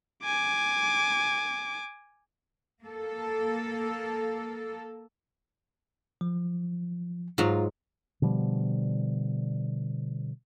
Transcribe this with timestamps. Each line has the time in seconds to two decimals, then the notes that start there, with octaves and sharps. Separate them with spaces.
0.25 G#5 D6
2.82 A#3 A4
6.21 F3
7.38 G#2 F#3 F4
8.22 B2 D3 F3 G3